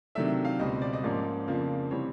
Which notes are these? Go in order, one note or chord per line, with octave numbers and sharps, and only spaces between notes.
C3 D#3 F#3 A3 D4 E5
F5
C#2 B2 G3 C4 D#5
D5
D#5
G#2 F3 A#3 C#4 D5
F2 C#3 F3 A#3 D4
C3 E3 G3 C4 C#5